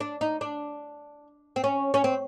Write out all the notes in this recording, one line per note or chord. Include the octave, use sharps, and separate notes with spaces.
D4
D#4
D4
C4
C#4
C#4
C4